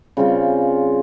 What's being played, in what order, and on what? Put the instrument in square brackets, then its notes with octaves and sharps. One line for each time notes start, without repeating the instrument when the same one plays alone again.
[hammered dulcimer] C#3 G3 C4 F4